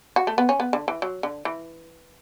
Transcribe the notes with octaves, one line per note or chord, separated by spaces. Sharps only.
F#4
A3
B3
C#4
B3
D3
E3
F#3
D3
E3